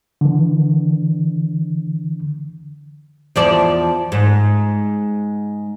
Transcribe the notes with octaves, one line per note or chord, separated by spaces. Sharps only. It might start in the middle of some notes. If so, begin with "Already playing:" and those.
D3 E3
E2 F3 D5
G#2